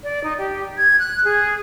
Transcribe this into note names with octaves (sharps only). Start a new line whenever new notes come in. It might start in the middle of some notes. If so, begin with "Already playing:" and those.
D5
D#4
G4
G#6
F#6
G#4